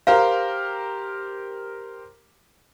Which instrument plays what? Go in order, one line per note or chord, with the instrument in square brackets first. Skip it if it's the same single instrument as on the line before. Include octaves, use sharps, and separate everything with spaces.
[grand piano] G4 A#4 C5 [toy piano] F5